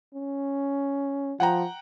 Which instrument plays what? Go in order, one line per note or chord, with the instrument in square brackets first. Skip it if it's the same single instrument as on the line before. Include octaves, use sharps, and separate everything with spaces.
[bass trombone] C#4
[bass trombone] F3 [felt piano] F#5 G5 A#5